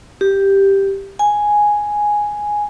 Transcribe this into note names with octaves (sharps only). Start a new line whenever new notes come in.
G4
G#5